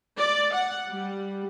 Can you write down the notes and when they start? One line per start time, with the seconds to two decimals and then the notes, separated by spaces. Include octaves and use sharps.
0.19 D5
0.54 F#5
0.90 G3